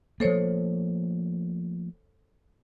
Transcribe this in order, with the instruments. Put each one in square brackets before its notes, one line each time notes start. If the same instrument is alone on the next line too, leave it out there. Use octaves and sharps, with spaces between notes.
[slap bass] F3 A3 A#3 [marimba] A4 C5 C#5